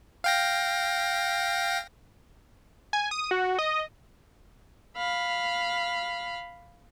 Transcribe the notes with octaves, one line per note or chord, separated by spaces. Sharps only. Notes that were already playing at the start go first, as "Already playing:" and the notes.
F5 G5 A#6
G#5
D#6
F#4
D#5
F5 B5